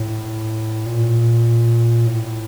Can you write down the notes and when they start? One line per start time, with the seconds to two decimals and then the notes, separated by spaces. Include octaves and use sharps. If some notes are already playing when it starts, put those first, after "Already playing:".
Already playing: A2
0.86 A#2
2.07 A2